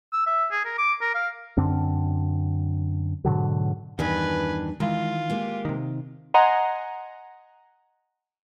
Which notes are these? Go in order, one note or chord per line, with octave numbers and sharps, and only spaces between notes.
E6
E5
G#4
A#4
D6
A#4
F5
F#2 D3 C4 D4
G#2 B2 D3 F#3
E2 G2 D#3 E3 D4 B4 G#5
D#3 E3 G#3 F4
G#3 A#3 G4
C3 D#3
D#5 F#5 G#5 A#5 C6